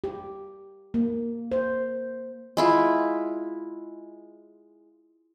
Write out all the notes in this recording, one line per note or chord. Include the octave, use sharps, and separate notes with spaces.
G4
A#3
C5
G#3 E4 F4